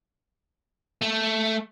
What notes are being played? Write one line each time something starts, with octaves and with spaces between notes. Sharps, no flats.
A3